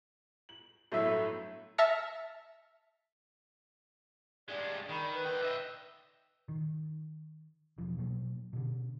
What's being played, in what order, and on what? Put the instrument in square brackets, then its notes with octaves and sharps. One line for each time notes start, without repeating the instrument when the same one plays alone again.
[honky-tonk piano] F#7
[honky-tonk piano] G1 A2 F#3 [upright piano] A3 E5
[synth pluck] E5 A5 F6 A#6 C#7
[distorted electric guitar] G2 G#3 [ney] D5
[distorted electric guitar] D#3 [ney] B5
[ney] B4
[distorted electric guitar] D3 G5
D#5 E5
[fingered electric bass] D#3
E1 B1 F3
B2 F#3 A#3
B2 D3